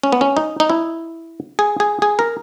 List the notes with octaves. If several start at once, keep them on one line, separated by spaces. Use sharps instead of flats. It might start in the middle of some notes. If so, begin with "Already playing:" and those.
C#4
B3
C#4
D#4
D#4
E4
G#4
G#4
G#4
A#4